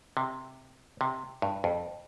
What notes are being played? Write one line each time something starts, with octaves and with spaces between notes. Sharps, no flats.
C3
C3
G2
F2